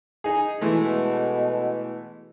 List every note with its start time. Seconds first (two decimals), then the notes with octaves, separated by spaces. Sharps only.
0.24 D#4 G#4
0.61 B2 E3 G#3 A3